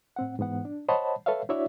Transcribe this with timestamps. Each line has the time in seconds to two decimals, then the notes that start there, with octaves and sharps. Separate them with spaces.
0.16 A2 C4 F#5
0.39 G#2 E3 B3 F#5
0.65 D4
0.89 C5 C#5 D#5 F#5 A5 B5
1.26 A4 B4 C#5 E5 F5
1.49 D4 E4 F#4 C#5 D5 E5